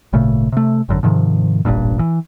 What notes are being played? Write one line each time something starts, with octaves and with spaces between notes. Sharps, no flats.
G#1 A#2 C#3 A3
C3 A3
G#1 F#2 D3
G#2 C3 D#3 F3
E1 A1 G2 A#2
E3